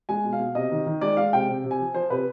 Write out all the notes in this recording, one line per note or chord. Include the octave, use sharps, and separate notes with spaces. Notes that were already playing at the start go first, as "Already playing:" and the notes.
G#3 G#5
B2
F5
B2
C3 D#5
D#3
D#3
G#3 D5
G#3 F5
C3 G5
C3
C3
G#5
F3
F3 C5
C3 B4